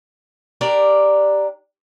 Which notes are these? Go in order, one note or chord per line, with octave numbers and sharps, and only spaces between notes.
D4 G4 A#4 D5